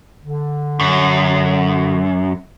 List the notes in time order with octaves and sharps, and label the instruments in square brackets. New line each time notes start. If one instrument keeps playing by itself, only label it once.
[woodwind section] D3
[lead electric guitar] F#2